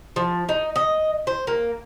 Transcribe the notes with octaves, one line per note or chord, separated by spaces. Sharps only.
F3
D#4
D#5
C5
A#3